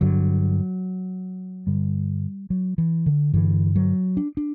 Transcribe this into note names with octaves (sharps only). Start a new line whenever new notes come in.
G2 D3 F#3
G2 D3 G3
F#3
E3
D3
G2 D3 E3
F#3
D4
D4